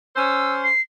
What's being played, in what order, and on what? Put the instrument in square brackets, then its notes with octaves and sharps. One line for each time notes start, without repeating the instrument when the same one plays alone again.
[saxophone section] C#4 C5 [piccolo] E6
[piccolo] C7